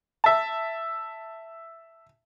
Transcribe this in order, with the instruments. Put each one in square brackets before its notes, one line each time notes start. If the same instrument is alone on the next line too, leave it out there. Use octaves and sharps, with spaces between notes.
[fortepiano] E5 A5